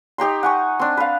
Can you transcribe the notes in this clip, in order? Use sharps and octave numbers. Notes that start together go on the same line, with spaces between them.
D#4 G4 A#5 C6
F#5 G#5 C#6
C4 D4
B4 F5